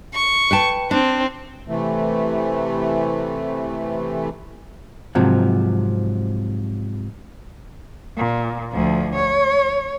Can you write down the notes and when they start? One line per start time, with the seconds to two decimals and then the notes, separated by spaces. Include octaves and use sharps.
0.14 C#6
0.51 B4 G5 A5
0.91 C4 D4
1.68 C3 E3 A3
5.15 G#2 C3 F3 F#3
8.17 A#2
8.72 D2 F3
9.15 C#5